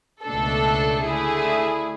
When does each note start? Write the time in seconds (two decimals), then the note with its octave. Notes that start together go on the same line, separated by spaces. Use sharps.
0.23 C#2 B2 A3 D4 A4
1.04 D3 A3 E4 G#4